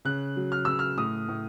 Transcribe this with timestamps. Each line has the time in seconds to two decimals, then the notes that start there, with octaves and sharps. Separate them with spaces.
0.05 C#3 F#6
0.36 F#3
0.52 F6
0.65 C#3 E6
0.79 F6
0.97 A2 D#6
1.28 A2